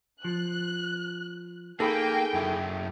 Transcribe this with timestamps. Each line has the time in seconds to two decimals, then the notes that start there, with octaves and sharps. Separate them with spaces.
0.25 F3 F#6
1.80 A#3 D#4 G#4 A4 G5 G#5 B5
2.34 F#2 E4